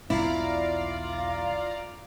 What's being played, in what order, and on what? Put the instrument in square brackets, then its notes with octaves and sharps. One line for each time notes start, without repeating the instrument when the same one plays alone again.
[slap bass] B1 E2 B2 [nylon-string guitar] E4 [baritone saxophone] F4 [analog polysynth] D5 F5 A#5